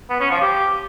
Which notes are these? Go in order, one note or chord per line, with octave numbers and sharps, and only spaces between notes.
B3
C#4
F3
G4